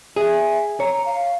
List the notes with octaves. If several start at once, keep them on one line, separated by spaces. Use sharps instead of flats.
G#4 E5
C#5 A#5
F5